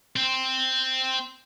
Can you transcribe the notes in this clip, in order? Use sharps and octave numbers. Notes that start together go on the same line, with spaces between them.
C4